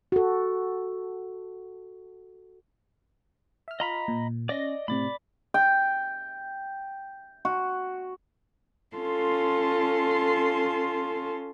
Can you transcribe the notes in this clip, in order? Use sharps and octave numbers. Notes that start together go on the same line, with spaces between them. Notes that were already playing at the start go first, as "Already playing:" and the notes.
F#4 A4
E5 F6
F4 D#5 A#5 B5
A#2
C#4 D5 D#5 A#6
A2 C3 D5 B5
G5
F#4
C#4 F4 A4 A5 C6